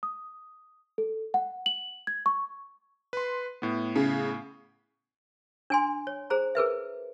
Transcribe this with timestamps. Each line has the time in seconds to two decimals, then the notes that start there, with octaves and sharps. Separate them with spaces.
0.03 D#6
0.98 A4
1.34 F#5
1.66 F#7
2.07 G#6
2.26 C#6
3.13 B4 C6
3.62 A2 B3
3.96 C#3
5.70 D4 G#5 C6
6.07 C#5
6.30 G#4 C5 A#5
6.55 G#4 A#4 B4 E5